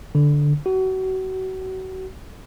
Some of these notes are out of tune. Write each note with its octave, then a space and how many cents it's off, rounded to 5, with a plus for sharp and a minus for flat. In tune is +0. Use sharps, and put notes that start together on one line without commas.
D3 -5
F#4 +30